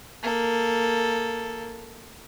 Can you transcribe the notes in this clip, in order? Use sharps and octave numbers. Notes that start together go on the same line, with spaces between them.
A#3 A4